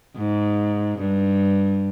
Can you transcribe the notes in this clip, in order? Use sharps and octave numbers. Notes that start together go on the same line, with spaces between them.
G#2
G2